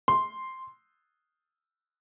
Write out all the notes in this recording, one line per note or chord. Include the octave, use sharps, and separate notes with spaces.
C6